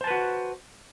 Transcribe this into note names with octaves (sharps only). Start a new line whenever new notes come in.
F#4 B4 C5 A5